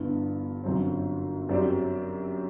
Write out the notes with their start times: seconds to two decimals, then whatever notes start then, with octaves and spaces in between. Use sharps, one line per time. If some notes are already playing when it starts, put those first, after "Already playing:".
Already playing: G1 G2 E3 B3
0.64 G1 F#2 F#3 C4
1.49 F#2 F#3 C4 G4 D5